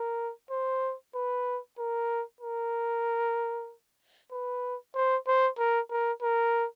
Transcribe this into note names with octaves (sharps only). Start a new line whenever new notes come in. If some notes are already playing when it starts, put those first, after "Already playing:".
Already playing: A#4
C5
B4
A#4
A#4
B4
C5
C5
A#4
A#4
A#4